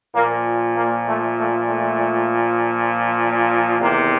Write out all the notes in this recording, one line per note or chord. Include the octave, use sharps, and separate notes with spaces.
A#2 F3 A#3
A#3
A3
A3
A3
E2 C3 D#3 A#3